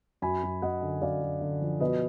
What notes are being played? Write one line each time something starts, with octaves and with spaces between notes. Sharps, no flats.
F#2 G#5 B5
F#2
F#2 D#5 F#5
D3
F#2 D5 F5
F#2
D3
F3
B2 B4 D#5